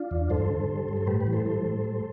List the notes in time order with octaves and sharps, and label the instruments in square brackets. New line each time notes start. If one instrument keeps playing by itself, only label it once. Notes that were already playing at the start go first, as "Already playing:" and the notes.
Already playing: [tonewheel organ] D4 F4
E2
G2 A4 C5
D3
G3
G2
C5
A2 G4 B4
G4 B4
E3
A4 C5
G3 A4 C5
A2
G3